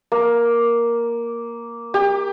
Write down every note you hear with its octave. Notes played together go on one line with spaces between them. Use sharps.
A#3
G4